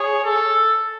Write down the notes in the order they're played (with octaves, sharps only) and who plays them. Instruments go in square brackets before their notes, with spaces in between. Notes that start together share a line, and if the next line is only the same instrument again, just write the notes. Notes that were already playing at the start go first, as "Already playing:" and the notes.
Already playing: [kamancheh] G#4 [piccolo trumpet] C#5
[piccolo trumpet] A4